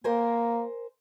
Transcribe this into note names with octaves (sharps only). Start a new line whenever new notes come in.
A#3 A#4 C5 G#5